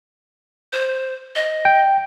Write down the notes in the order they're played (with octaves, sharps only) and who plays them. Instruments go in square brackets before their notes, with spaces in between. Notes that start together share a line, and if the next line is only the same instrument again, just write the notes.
[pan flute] C5
D#5
[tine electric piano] G5